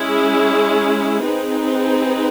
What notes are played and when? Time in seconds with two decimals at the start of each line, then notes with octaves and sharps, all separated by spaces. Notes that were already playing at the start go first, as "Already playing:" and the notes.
Already playing: G#3 C#4 E4 G#4
1.25 C4 D#4 G#4 B4